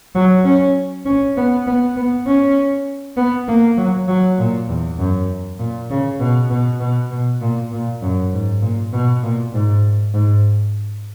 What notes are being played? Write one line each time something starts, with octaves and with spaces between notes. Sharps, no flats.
F#3
C#4
C#4
B3
B3
B3
C#4
B3
A#3
F#3
F#3
A#2
E2
F#2
A#2
C#3
B2
B2
B2
B2
A#2
A#2
F#2
G#2
A#2
B2
A#2
G#2
G#2